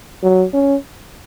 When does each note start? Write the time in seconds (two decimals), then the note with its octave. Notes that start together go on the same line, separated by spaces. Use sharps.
0.23 F#3
0.53 C#4